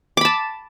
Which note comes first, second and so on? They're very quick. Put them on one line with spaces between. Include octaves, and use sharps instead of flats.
D6 B5 A5